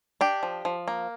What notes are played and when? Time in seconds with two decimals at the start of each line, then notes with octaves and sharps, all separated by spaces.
0.21 D4 G4
0.43 F3
0.65 F3
0.88 A#3